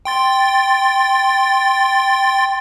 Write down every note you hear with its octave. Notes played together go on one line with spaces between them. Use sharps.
G5 C6 A6